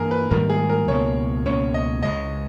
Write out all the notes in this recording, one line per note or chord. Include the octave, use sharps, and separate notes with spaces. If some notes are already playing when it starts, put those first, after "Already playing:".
Already playing: G2 E3 A#3 G#4 A#4
B4
G#2 D#3 G3 A#3 A#4
G#4
A#4
C#2 B2 A#3 C#5
C#2 B2 A#3 C#4 C#5
D#5
C#2 C#3 G#3 D#5